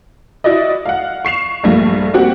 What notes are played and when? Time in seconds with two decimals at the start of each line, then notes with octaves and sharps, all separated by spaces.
0.44 E4 F#4 D5 D#5
0.86 F5 F#5
1.25 C#6 C7 E7 F7
1.63 A#1 G2 A3 A#3 F4 A#6
2.14 A#3 C4 F#4 G4 F#5